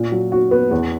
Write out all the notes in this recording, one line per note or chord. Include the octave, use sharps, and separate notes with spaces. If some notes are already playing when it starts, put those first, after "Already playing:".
Already playing: A#2
F#3
F#4
B3
E2